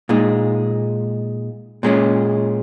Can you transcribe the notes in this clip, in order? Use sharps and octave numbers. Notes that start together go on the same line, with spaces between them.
A#2 G#3 D#4
A#2 G#3 C#4